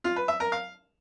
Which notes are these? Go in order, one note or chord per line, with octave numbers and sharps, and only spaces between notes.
F4
B4
E5
A#4
F5